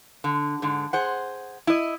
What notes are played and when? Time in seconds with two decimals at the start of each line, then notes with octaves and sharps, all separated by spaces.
0.24 D3
0.62 G#2 D3
0.93 G#4 C5 F#5
1.67 E4 D#5